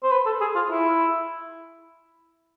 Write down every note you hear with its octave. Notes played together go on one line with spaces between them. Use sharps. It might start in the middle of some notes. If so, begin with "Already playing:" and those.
C5
B4
A4
G#4
F4
E4